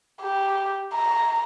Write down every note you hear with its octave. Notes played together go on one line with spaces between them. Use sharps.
G4
A#5